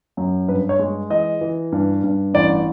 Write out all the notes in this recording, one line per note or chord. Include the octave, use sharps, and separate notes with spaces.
F#2
G2 B4
C#5
G#3
E3 D#5
E3
G2
G2
A1 D5